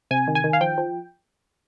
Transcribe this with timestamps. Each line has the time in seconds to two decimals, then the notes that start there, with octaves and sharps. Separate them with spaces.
0.11 C3 G#5
0.27 D#3
0.35 G#5
0.44 D#3
0.53 F5
0.61 F3 G5
0.78 F3